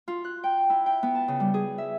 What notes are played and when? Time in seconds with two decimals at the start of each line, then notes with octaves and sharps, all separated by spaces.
0.08 F4
0.25 F#6
0.44 G5
0.70 E4
0.86 G5
1.03 B3
1.15 A5
1.28 C#3
1.40 G3
1.54 G#4
1.78 E5